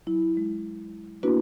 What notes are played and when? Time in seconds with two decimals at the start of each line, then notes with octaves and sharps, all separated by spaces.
0.07 F#3 E4
0.37 G#3
1.23 A#3 B3 D4 E4 F#4 B4